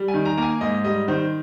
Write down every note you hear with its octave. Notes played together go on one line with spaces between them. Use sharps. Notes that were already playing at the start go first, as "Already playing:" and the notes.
Already playing: G3
G#5
D#3
A#5
A#3 A#5
G#5
G#2 D#5
G3 D#5
D#3 C5